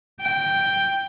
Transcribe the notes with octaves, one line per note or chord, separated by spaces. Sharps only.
G5